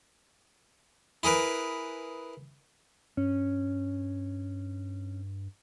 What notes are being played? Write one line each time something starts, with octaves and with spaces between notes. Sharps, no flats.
E4 G#4 A#4 B4
G2 C#4